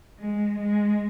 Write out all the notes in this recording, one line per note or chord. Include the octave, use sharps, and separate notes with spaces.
G#3
G#3